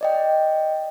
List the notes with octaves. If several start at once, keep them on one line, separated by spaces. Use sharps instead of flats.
D5 D#5 G5